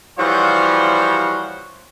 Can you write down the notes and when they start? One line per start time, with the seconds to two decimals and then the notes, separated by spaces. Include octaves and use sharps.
0.18 E3 F3 G3 F#4 C5 C#5